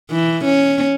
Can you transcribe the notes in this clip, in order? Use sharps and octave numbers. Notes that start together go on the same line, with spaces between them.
E3
C#4